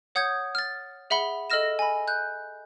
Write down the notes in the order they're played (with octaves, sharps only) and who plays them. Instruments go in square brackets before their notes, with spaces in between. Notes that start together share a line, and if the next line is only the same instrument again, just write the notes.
[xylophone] C#5 F#5 D#6 G6 G#6
F6 A6
G#4 E5 F#5 B5 G7
A4 D#5 E6 F6 A#6 E7
G#5 B5
F#6 G6